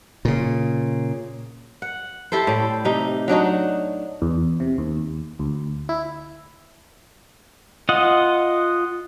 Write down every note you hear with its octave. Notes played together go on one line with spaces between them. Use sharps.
A#2 C#3
F#5
E4 G4 A4 C5
A2 D5
C3 D#4 G4
F#3 D4 D#4 F#4
E2
C3
D#2
D2
E4
F4 D#5 F#5